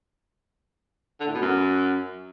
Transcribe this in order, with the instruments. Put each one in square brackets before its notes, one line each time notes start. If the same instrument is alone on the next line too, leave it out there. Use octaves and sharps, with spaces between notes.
[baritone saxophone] D3
A2
B2
F#2